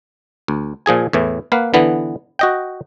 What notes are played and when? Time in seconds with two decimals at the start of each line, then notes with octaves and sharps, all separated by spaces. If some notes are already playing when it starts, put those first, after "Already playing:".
0.48 D2
0.86 A#2 F3 G#4 G#5
1.13 E2 A2 E3
1.52 A#3 B4 F5 F#5
1.74 D3 E3 B3
2.39 F#4 D#5 G5